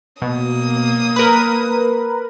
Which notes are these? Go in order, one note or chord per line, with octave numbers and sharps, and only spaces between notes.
B2 A#3 D#6
A#4 B4